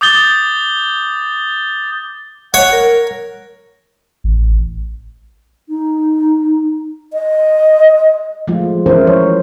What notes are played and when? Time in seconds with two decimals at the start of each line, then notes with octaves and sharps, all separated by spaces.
0.01 D6 D#6 G6 A6 G7
2.54 C#5 F#5
2.72 A#4
4.24 A1
5.68 D#4
7.13 D#5
8.48 F3 G#3 A3 F4
8.86 E3 C#4 E4 A#4 C5
9.07 F3 F#3 C#5